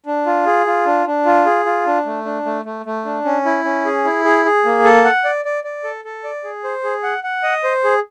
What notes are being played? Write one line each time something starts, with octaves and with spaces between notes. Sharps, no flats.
D4
F4
G#4
F4
D4
D4
F4
G#4
F4
D4
A3
D4
A3
A3
A3
D4
C#4
E4
C#4
G#4
E4
G#4
G#4
A#3
A4
F#5
D5
D5
D5
A4
A4
D5
G#4
C5
G#4
F#5
F#5
D#5
C5
G#4